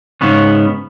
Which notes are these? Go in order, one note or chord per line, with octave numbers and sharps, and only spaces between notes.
G#2 C#3 B3 C#4